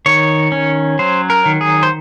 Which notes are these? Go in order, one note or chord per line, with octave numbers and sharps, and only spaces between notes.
D#3 C#5
C#4
F#3 C5
A#4
D#3
G#4
C5